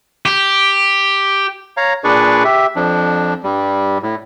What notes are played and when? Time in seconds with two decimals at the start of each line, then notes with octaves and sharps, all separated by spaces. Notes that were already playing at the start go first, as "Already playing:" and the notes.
0.26 G4
1.77 C#5 F5 A#5
2.04 A#2 D4 G#4 B4 D5 C#6
2.44 G4 E5
2.76 F2 F3 D4
3.44 G2 G3
4.03 A2